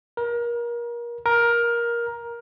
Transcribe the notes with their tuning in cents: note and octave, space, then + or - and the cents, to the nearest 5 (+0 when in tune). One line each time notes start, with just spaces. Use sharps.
A#4 +30
A#4 +15